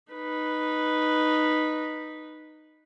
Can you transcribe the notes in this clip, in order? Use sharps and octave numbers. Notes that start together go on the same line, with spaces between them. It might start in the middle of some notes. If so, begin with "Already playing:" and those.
D#4 B4